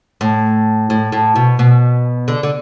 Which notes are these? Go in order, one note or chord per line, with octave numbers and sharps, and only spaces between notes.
A2
A2
A2
B2
B2
D3
D3